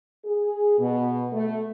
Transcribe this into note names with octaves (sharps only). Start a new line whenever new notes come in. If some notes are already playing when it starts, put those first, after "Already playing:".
G#4
B2
A3